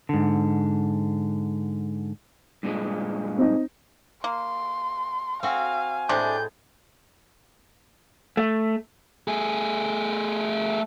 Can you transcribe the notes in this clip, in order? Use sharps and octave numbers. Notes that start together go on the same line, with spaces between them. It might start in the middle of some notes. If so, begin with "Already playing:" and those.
G#2 D3
G2 A#2 G#3
C4 D#4
A#3 C6
C4 F#4 F5 G#5
A2 C3 G#3 D4 G6
A3
A3 G#4